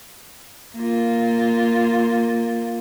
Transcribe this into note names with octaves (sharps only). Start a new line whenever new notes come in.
A#3 F4